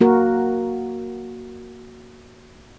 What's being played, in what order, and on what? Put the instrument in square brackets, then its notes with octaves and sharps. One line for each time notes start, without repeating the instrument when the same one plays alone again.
[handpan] A#3 F#4 A#4